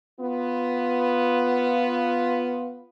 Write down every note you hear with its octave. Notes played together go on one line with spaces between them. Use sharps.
B3 F4